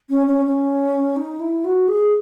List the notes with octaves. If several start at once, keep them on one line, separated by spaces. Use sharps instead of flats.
C#4
C#4
C#4
D#4
E4
F#4
G#4